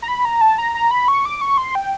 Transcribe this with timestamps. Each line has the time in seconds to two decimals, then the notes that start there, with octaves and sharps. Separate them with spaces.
0.02 A#5
0.08 B5
0.25 A#5
0.41 A5
0.58 A#5
0.75 A#5
0.91 B5
1.08 C#6
1.25 D6
1.41 C#6
1.58 C6
1.75 G5